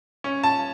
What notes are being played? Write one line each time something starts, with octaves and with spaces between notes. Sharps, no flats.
C#4
A5